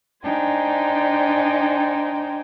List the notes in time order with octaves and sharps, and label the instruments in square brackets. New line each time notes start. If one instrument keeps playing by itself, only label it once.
[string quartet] D4 D#4 C5 G5 G#5